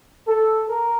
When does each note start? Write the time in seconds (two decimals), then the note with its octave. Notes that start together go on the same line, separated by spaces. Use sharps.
0.28 A4
0.69 A#4